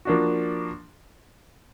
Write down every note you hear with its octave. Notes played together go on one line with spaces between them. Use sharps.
F3 A#3 D4 F#4